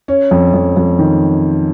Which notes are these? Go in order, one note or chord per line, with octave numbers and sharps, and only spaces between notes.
C#4
F2
F2
F2
D#3